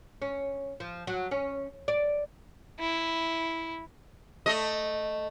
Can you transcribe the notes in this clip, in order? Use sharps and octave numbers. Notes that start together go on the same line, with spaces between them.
C#4
F3
F#3
C#4
D5
E4
A3 D#5